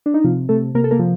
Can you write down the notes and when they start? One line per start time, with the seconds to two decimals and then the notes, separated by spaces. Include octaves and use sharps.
0.06 D4
0.14 D#4
0.24 C3 F3 F4
0.49 C3 A3 A4
0.74 C3 A#3 A#4
0.84 A4
0.91 A#3 A#4
0.99 F3